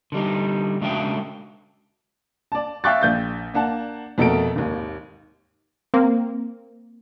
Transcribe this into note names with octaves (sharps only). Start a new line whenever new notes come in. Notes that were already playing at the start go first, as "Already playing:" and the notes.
D3 G3 D#4
C#3 G#3 D4 F#4 E5 G5
D5 A5
E5 F5 G5 C#6 F#6 A6
A#1 G6 A6
A#3 D4 F#5 A5
F2 B2 A3 A4 A#4 D7
G#1 D#2
A#3 C4